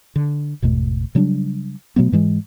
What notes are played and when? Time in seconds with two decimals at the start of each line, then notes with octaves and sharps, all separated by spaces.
0.16 D3
0.62 G#1 E2 B2 A3
1.15 C#3 F#3 G3 D4
1.96 B2 F#3 A3 B3
2.12 G#2 E3 G#3